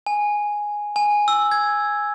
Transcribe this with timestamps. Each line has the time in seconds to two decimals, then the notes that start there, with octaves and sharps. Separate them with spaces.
0.07 G#5
0.96 G#5
1.28 E6
1.52 G#6